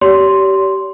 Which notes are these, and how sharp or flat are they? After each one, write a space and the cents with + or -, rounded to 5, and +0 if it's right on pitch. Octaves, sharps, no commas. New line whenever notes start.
G4 -25 C#5 +45 C6 +0